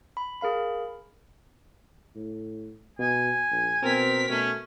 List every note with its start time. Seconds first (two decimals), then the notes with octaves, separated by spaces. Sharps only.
0.17 B5
0.41 G#4 A#4 F5 B5
2.16 A2
2.99 B2 G#5
3.51 A#1
3.83 B2 C4 A#4 B6
4.30 B2 A3 C#4